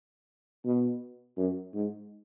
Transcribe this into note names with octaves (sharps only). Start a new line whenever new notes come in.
B2
F#2
G#2